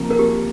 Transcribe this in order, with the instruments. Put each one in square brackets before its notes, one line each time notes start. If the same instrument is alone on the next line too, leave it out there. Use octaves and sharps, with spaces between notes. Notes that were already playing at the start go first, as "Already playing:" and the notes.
Already playing: [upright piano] C3 F3 A#3
[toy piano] A#4
G4